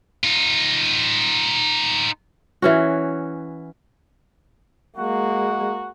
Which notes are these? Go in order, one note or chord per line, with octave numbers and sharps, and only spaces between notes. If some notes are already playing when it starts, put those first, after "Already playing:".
D#4 F4
E3 C#4 F#4
G#3 A#3 F#4